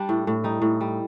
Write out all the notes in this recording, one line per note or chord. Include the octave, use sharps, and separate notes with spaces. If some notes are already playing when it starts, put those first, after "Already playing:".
Already playing: G3 D4
A2
A2
G3 D#4
A2
G3